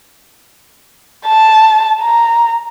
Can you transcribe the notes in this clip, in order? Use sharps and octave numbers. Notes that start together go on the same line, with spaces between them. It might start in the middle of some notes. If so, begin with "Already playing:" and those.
A5
A#5